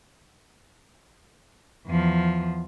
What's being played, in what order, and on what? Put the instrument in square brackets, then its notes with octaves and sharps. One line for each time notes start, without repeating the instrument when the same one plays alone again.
[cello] E2 F3